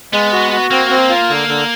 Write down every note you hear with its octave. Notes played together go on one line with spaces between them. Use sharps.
G#3 B3
F#4
F#4
A#3 C4
C4
F4
D3
D3